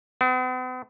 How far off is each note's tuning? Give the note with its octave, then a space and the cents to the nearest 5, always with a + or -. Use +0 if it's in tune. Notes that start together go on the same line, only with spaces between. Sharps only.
B3 +45